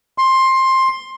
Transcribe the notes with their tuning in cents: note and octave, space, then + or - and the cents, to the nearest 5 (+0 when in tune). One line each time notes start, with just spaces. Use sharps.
C6 +15